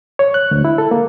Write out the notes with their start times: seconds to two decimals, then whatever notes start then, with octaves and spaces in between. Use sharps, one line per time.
0.19 C#5
0.34 F#6
0.51 D2
0.65 E4
0.78 A4
0.91 A#3